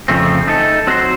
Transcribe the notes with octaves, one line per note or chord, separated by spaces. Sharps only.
F2 C#3 F3 A3 C4
A3 D#4 A4
F#3 C4 F#4 C5